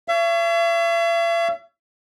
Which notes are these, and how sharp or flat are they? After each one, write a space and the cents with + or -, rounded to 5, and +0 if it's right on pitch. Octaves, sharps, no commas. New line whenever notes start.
C#5 +25 E5 +45